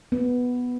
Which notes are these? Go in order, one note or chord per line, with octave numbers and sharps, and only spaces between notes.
B3